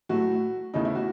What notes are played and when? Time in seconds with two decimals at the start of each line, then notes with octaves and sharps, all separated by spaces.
0.09 A2 F#3 A3 F#4
0.74 E2 C#3 E3 A3 D#4
0.85 E4
0.95 F#4